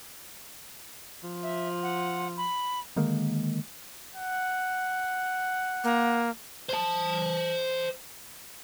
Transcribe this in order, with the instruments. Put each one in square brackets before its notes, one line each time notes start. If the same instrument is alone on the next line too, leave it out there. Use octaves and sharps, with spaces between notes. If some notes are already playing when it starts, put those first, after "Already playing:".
[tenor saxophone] F3
[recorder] E5
F#5
B5
[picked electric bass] D3 D#3 G#3 A#3
[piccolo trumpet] F#5
[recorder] A#3
[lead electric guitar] C5 A5